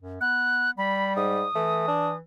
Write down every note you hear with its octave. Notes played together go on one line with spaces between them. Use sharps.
F#2
B3 F#6
G3 B5
G#2 D#6
E3 A3
D4